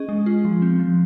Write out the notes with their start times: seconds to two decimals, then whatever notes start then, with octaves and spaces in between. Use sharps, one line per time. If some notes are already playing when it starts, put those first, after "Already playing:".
Already playing: C#4 G#4 D#5
0.09 G#3
0.26 F4
0.45 F3
0.62 C4
0.79 F3